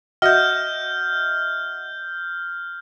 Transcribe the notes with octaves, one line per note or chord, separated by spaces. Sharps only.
F#4 D#5 E5 F6 G6